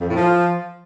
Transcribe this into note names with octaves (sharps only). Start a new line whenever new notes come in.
F2
A2
F3